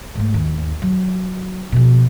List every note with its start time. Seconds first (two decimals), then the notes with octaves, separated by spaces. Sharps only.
0.15 G#2 A3
0.34 D#2
0.82 F#3
1.72 B2 F3